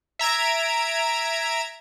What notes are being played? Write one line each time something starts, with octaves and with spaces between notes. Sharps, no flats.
E5 A#5 G#6 D7